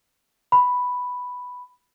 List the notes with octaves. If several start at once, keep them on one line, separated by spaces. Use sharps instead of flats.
B5